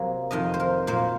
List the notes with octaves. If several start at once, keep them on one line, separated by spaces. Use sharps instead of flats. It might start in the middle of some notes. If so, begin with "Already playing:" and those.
Already playing: C3 F#3 A#3
F2 C3 D#3 D#5
C5
A#4
A#2 F#3 A#3 C5